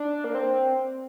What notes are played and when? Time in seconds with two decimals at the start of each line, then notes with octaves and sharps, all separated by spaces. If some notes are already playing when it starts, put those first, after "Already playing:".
Already playing: D4
0.24 A#3
0.35 C4